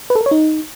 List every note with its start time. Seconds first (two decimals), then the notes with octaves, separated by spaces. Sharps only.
0.10 B4
0.15 A4
0.21 A#4
0.26 C#5
0.31 D#4